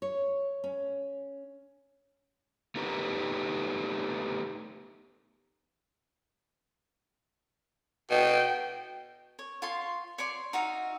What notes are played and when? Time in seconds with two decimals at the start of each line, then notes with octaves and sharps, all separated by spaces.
0.02 C#5
0.64 C#4
2.76 A3 B3 D#4 G4 A#4 B4
8.11 B2 G5
9.39 C#5
9.62 F4 C#5 C6
10.18 C#5 D5 C6
10.53 D#4 F#4 E5 F5